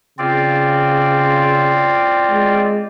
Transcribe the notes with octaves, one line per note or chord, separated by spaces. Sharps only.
C#3 C4 F4 D5
G#3